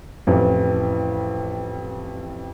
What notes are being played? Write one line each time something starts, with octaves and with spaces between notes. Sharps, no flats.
A1 F2 E3